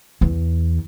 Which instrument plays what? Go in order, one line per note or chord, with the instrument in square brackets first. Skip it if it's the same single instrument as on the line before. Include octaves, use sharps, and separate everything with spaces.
[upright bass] E2